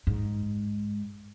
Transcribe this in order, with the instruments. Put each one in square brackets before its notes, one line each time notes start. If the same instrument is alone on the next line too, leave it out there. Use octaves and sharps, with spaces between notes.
[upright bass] G#2